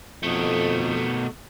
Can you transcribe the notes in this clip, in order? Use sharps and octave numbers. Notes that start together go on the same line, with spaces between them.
F2 B2 A3